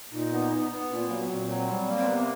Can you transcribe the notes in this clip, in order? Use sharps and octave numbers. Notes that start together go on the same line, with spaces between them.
A#2 D#4
B3
B3
B3
A#2 D4
C4
F#3 A#3
B3
A#2 C4
F#3
G3
A#3
C4
C3 B3